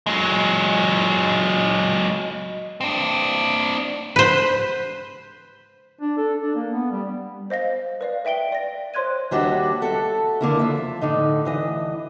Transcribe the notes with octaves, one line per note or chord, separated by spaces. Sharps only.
F#3 G#3
C4 D4
B4 C5
D4
A4
D4
A#3
B3
G3
C5 D#5 F5 A#6
B4 D5 F5
B4 E5 G5 D7 G7
D5 A#6
C5 C#5 C6 F#6 G#6 D#7
D#2 G3 D4 F#4 E5
F#4 A4 E5
E2 D3 A#3 E4
F3 E5
A2 D3 D#4
D2 E3 D#5